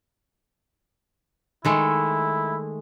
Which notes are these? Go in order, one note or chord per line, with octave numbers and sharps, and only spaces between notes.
D#3 G#3 A3 E4